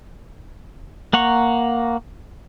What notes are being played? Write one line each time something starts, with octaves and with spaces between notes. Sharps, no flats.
A#3 F#5 A#5 C#6